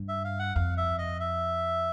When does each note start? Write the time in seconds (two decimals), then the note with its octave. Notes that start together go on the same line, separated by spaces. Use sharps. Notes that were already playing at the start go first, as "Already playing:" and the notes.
Already playing: G2
0.08 E5
0.24 F5
0.39 F#5
0.55 F2 F5
0.77 E5
0.98 D#5
1.20 E5